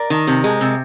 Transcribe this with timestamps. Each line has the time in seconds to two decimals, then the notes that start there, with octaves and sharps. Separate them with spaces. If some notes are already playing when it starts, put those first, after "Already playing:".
Already playing: A#4 D5
0.10 D#3
0.27 C3
0.44 G#3
0.61 C3